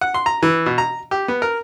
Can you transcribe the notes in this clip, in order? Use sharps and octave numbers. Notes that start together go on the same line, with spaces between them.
F#5
C6
A#5
E3
B2
A#5
G4
B3
A#4